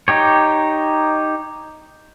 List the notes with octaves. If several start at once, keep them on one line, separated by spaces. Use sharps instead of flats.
D#4 G4 C#5